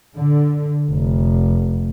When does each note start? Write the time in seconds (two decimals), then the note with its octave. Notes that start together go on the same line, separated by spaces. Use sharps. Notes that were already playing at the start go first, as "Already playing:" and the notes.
0.16 D3
0.89 F1